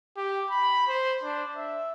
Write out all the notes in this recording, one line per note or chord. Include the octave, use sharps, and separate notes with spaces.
G4
B5
C5
D4
E5